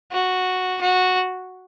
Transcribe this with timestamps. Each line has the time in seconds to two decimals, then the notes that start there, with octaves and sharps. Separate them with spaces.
0.12 F#4
0.81 F#4